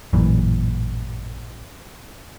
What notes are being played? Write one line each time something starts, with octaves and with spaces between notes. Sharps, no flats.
A1 F#2 A#2 E3